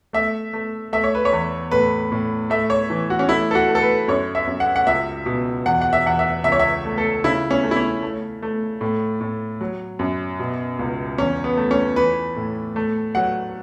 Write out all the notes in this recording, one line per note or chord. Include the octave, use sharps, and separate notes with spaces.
A3 E5
A3
A3 E5
C#5
B4
C#5
E2
A2 B4
A2
A3 E5
C#5
E3
F#4
C#4
A3 E4
A4
F#4
A3
A4
B4
F#2 C#5
E5
F#2
F#5
F#5
C#2 E5
B2
E2 F#5
F#5
E5
E2 F#5
E5
C#2 E5
C#5
E5
A3
A4
C#3 E4
C#4
A3
E4
C#4
A3
A3
A2
A2
F#3
F#2
B2
C#2
E2 C#4
B3
A3
C#4
E3 B4
A2
A3
F#3 F#5